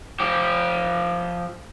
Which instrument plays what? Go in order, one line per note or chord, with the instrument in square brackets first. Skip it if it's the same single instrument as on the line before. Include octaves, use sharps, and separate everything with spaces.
[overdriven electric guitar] F3 G4